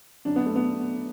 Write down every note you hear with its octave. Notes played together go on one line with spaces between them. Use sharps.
F#2 D3 D4
B3
A3
B3